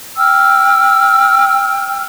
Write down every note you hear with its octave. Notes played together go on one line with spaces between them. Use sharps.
G5 E6 F6